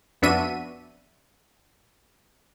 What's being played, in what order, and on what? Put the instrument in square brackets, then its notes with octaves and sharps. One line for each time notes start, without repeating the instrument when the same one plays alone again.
[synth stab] F2 B3 D4 F#4 E5 D#7